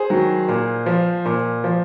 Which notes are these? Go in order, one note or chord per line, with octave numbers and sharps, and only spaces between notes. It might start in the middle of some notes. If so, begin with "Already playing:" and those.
Already playing: G#4 C5
D#3 F#3
A#2
F3
A#2
F3